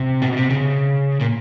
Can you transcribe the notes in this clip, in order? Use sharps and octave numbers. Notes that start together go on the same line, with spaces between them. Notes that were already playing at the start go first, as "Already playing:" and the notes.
Already playing: C3
B2
C3
C#3
A#2